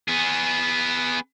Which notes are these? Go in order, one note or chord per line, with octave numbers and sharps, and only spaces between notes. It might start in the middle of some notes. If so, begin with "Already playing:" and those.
B3 G#4